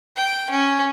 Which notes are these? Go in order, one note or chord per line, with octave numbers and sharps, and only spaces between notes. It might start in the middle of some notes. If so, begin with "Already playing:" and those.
G5
C#4